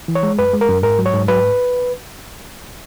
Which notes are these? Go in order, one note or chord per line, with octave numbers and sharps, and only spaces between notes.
E3
C#5
G#3
F#2 B4
G#3
A#4
F#2
G#2 A#4
F#3
C#5
G#2
F#3 B4